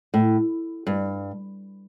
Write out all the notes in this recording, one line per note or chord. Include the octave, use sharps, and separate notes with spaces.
A2
G2